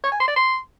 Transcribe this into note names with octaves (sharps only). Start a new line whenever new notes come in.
C#5
G#5
C6
D5
C6